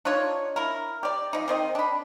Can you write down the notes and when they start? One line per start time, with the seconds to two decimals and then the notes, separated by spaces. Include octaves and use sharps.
0.05 D4 D#4 F4 C#5
0.56 E4 A#4
1.03 G4 D5
1.33 F3 D#4
1.48 D#3 C4 D#5
1.75 D4 B5